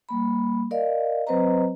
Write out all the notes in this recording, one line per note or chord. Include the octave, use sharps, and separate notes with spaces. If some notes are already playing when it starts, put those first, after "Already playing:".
G3 A#3 B5
A#4 D5 D#5 F5
F#3 C4 B4 C5 D#5 A#5